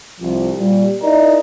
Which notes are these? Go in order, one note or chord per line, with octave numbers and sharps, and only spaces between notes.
C2 F3
A#2 G3
D#4 E4 A#4 D5 D#5 A#5